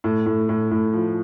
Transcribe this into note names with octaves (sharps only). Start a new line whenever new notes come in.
A2
A2
A2
A2
F3